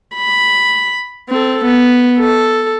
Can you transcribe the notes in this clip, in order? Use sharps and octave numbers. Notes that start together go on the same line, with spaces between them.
B5
C4 A4
B3
A4